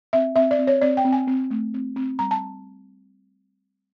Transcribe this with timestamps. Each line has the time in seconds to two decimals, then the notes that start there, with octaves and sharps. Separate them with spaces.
0.13 C4 E5
0.36 C4 E5
0.51 D5
0.59 C4
0.67 C#5
0.81 C4 D5
0.97 G5
1.05 C4
1.12 G#5
1.27 C4
1.51 A3
1.74 C4
1.96 C4
2.19 G3 A#5
2.31 A5